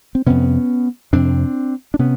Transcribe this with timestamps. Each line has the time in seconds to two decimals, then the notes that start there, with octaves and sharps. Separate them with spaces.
0.15 C4
0.26 F2 C3 B3 C#4
1.13 F2 C3 C4 D4
1.94 D4
1.99 C3 B3 C#4